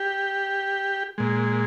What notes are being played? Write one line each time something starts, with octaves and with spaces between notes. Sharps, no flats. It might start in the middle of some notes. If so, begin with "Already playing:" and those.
Already playing: G4
A#2 G#3